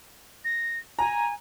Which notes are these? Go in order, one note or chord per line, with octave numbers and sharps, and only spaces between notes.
A#6
G#5 A#5